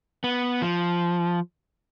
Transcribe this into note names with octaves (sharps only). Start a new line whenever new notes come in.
B3
F3